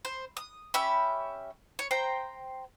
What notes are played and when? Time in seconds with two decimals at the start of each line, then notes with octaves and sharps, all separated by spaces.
0.05 C5
0.37 D#6
0.74 C#4 G4 E5 B5
1.79 C#5
1.91 C5 G5 A#5